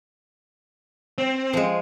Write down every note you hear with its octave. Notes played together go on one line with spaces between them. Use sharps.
C4
F3 G#3